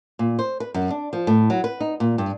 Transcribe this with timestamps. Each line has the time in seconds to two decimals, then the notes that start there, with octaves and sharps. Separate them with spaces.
0.19 A#2
0.39 C5
0.60 B4
0.74 F#2
0.90 D4
1.13 F3
1.27 A2
1.50 F#3
1.64 B4
1.80 D#4
2.00 A#2
2.18 G2